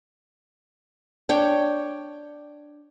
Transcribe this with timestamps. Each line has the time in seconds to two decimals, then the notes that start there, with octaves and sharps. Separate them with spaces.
1.29 D4 C#5 G5